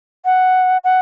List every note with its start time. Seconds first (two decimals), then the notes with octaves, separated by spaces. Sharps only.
0.25 F#5
0.84 F#5